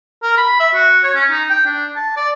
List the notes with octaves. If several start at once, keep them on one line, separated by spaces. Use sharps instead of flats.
A#4
B5
E5
F#4
C#5
C#4
D#4
G5
D4
A5
D5